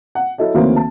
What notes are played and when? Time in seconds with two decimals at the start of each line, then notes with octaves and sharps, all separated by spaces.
0.15 F#5
0.38 F#3 E4 A4 D#5 E5
0.54 D2 D#3 E3 F#3 A#3 C4
0.76 A5